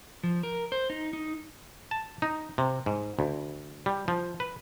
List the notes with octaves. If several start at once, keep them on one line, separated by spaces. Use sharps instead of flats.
F3
A#4
C5
D#4
D#4
A5
D#4
C3
G#2
D2
G3
F3
B4